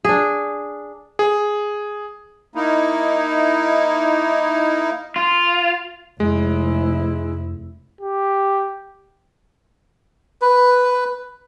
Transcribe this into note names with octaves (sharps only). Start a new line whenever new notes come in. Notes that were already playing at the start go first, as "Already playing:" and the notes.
D4 G#4
G#4
A#3 D#4 E4
F4
F1 F2 G#3 E4
G4
B4